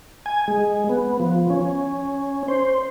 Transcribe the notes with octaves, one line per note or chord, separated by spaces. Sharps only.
G#5
G#3
B3
F3
C#4
C5